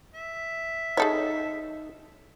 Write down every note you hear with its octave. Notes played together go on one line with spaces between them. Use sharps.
E5
D#4 G#4 A4 C#5